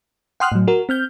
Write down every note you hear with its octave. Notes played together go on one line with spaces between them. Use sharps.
F#5 G5 C6 D#6 F6 F#6
A2 F#3
F#4 A#4
C4 F6 G6